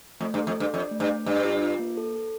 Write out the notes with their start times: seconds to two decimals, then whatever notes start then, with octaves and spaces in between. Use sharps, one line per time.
0.20 F2 A3
0.34 G2
0.38 A4
0.47 F2
0.56 G2 D4
0.73 F2 D5
0.91 A3
1.00 G2
1.09 D4
1.26 G2 D5
1.45 F4
1.62 F4
1.79 A#3
1.97 A4
2.15 A4